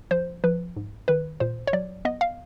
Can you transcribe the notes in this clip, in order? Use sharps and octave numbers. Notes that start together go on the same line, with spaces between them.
F3 C5
F3 B4
G#2
D#3 B4
A#2 C5
C#5
F#3 D5
B3 D#5
F5